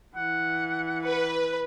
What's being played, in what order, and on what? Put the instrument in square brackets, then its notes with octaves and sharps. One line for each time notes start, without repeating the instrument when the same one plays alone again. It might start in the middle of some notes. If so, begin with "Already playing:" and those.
[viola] E3 [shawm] F#5
[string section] B4